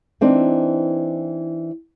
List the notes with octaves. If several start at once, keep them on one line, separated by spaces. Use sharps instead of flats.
E3 C4 D4 D#4